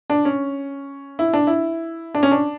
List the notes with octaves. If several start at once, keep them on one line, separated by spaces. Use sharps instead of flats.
D4
C#4
E4
D4
E4
D4
C#4
D4